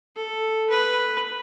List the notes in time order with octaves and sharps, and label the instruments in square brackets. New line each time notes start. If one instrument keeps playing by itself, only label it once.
[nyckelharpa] A4
B4